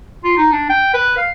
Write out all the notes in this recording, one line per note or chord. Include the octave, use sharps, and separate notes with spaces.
F4
D#4
D4
G5
B4
F5